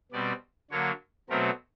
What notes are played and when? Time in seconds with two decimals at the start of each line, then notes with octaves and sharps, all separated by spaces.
0.12 B2 G3 C4 D5
0.71 D3 F#3 A#3 C#5
1.30 B2 F#3 A3 C4 A#4